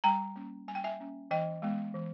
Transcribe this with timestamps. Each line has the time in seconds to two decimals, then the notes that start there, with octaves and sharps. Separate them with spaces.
0.04 G3 G5 A#5
0.36 A#3 C#4
0.68 G3 G#5
0.75 G5
0.84 E5 G#5
1.00 A#3 C#4
1.31 E3 D#5 G5
1.62 G#3 B3
1.94 E3